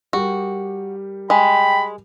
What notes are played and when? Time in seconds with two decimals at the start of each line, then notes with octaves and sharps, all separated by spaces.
0.13 G3 F#4 G4 A#4
1.30 G#3 G5 B5